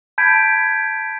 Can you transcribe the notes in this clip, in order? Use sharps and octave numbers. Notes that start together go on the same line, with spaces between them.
A5 B5 G6 G#6 B6 D7